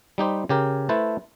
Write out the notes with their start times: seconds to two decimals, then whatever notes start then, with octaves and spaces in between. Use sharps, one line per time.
0.18 G3 D#4 G4 C5
0.49 C#3 G4 A#4
0.89 A3 E4 B4 C5 A5